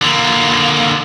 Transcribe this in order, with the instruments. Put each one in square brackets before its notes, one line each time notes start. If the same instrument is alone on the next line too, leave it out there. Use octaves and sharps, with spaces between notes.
[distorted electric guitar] D3 A#3